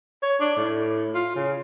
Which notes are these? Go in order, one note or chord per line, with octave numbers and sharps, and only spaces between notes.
C#5
D4
A2
F4
C#3